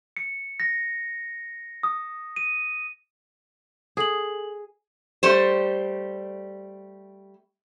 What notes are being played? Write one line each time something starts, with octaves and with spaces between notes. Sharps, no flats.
C#7
A#6
D#6
D#7
G#4 A4 F#7
G3 A3 C5